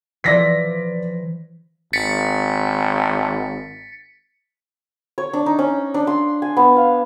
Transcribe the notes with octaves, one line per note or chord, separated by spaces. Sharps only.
E3 F3 D5 A#6 B6
G#1 A6 B6 C#7
C#5
D4
D#4
C#4
D4
C6
G#5
B3
F5